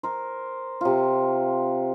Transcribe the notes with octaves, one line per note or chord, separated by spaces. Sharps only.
A#4 C5
C3 F4